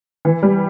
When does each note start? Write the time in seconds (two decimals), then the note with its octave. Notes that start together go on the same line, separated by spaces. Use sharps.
0.25 E3
0.43 G3